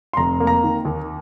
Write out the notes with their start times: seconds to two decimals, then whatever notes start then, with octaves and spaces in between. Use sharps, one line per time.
0.13 C6
0.17 F1 A#5
0.40 A#3
0.47 A#5
0.64 D#3
0.85 D#2